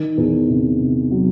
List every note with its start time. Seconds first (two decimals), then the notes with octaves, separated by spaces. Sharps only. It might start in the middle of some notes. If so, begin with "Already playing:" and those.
Already playing: D#3
0.17 E2
0.49 C3
0.79 C3
1.11 F#3